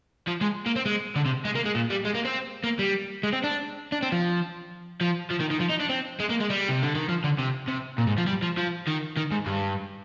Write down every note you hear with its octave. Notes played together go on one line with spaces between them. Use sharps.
F3
G#3
A#3
C4
G#3
D3
C3
G#3
A#3
G#3
A#2
G3
G#3
A#3
C4
A#3
G3
G#3
C4
D4
D4
C4
F3
F3
F3
D#3
D#3
F3
D#4
D4
C4
G#3
A#3
G#3
G3
C3
D3
D#3
F3
D3
C3
C3
A#2
G#2
F3
G3
F3
F3
D#3
D#3
G#2
G2